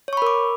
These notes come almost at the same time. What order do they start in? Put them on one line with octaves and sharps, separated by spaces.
C#5 C#6 B5 A#4 D6